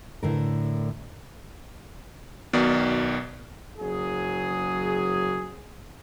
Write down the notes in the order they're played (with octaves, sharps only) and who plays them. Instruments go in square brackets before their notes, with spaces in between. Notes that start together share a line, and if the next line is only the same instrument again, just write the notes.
[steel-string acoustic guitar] A2 D3 A#4
[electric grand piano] B1 B2 D#3 D5 D6
[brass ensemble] F#1 F#3 G#4